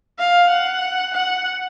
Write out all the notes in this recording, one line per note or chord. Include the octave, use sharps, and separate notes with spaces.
F5
F#5
F#5